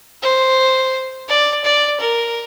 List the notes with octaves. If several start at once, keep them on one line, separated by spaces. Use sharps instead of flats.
C5
D5
D5
A#4